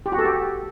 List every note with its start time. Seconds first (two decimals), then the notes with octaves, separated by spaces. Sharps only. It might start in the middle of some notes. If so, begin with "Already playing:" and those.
0.06 G4
0.12 F#4
0.19 A4
0.25 G4